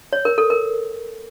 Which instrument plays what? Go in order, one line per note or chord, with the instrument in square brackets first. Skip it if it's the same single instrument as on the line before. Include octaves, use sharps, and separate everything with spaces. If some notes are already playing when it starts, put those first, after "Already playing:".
[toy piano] C#5
A#4
A4
A#4